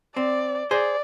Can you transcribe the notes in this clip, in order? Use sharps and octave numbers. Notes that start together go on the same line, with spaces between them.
C4 D5
G#4 C5 D5